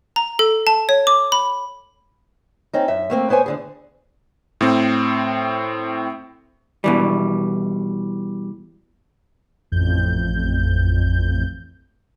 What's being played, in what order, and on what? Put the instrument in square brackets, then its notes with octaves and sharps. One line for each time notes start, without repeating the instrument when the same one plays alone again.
[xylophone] A#5
A4
A5
C#5
D6
B5
[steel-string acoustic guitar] C4 C#4 D#4
F#2 E5
A3 A#3 C4
B3 C5 C#5 G#5
D2 D3 G#4
[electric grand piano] A2 C4
[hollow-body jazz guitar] B2 E3 G3
[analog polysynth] A1 F2 G6